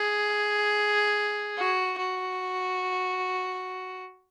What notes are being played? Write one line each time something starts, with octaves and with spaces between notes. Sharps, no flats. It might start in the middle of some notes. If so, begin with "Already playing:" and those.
Already playing: G#4
F#4
F#4